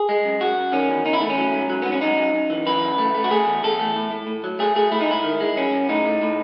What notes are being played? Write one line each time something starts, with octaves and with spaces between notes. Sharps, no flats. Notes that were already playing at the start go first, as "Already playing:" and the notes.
Already playing: G#4
G#3
F#2
F#2 F#4
F#2
D#3 C#4
E2
E2 D#4
E4
A3
C#4
F#3
G#2
F#3
G#2 B3
C#4
F#2 D#4
F#2
F#2
E3
F#2 B4
F#2
A3
A3
F#4
A3 G#4
E2
E2 A4
A3
A2
A2
A2
F#3
A3 G#4
A3 G#4
A3 E4
D#4
G#2 E4
D#3
G#3
F#2 C#4
F#2
A2 D#4
A3
A2